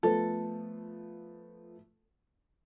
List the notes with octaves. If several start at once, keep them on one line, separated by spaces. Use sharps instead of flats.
F3 A3 B3 A4